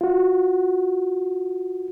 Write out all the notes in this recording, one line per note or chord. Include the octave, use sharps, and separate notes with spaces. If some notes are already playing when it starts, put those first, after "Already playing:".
F4 F#4